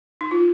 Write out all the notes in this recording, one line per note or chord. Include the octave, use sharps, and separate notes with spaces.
D#4
F4